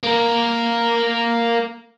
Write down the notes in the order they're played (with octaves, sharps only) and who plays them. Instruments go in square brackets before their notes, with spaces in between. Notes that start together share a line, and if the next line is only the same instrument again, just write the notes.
[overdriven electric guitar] A#3 A#4